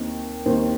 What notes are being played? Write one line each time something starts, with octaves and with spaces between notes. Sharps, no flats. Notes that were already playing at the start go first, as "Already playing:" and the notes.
Already playing: D#2 D#3 C4
D#2 D#3 C4 C5